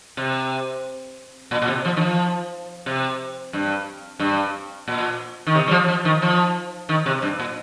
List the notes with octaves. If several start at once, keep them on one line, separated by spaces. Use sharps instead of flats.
C3
A#2
A#2
C3
F3
D#3
F3
C3
G2
G2
A#2
D#3
C3
G3
F3
F3
D#3
F3
D#3
C3
G2
A#2